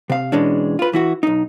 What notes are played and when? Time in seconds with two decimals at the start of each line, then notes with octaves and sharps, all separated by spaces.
0.10 C3 F5
0.32 B2 E3 G#3 C#4 D4
0.79 F4 B4
0.93 E3 E4 F#4
1.23 B1 D#4